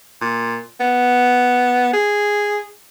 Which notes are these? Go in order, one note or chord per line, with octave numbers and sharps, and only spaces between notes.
A#2
B3
G#4